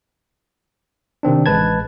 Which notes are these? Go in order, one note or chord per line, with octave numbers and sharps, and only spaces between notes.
C3 D#3 C4 D4
A1 G#3 B4 A5 G#6